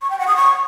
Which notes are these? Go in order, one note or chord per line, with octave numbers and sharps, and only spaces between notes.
C#6
G5
F#5
D#6
C#6